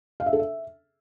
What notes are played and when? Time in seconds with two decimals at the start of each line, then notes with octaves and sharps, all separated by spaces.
0.20 F5
0.26 E5
0.33 A4
0.39 E5